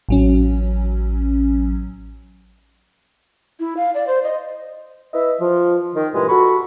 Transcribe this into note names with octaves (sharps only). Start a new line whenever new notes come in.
A1 F#3 C#4
E4
F5
D5
C5
D#5
E4 B4 D#5 E5
F3
D#3
G2 A#2 E3 G#3
F#4 A4 B5 C#6